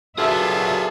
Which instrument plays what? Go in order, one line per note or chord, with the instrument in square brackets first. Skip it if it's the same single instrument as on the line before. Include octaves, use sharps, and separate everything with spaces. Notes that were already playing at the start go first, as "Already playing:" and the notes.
[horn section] F#3 [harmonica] B3 D4 F4 [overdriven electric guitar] G#4 A4 [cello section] E5